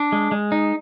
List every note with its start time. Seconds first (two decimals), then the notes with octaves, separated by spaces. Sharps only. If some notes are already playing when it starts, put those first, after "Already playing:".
Already playing: D4
0.12 G#3
0.32 G#3
0.52 D#4